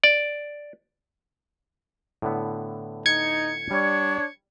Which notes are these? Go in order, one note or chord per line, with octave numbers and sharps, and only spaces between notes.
D5
A2 D3 B3
D#4 G#6 C#7
G3 D4 C#5